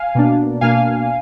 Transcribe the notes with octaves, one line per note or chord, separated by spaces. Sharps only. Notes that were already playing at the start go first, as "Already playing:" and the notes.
Already playing: F5 G#5
B2 A#3 D4
B2 A#3 D4 F5 G#5